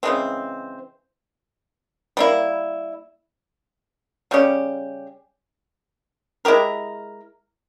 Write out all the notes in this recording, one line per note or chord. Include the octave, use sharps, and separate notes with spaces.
C#3 E3 G#3 C4
G3 A#3 E4
C#3 G3 C#4 G4
G#3 E4 G4 A#4